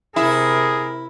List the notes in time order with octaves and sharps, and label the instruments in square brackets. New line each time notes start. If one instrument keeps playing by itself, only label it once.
[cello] C3 A#4 [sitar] E4 [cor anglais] G#4